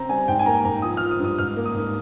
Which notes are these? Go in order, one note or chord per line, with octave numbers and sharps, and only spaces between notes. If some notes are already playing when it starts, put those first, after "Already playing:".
Already playing: C#3 C4 A#5
G3 G#5
G#2 G5
G#5
A#3 A#5
G#2 A#5
F3 D#6
F3 F6
D#6
G2
D#6
G#2 F6
A#3
D#6
G#2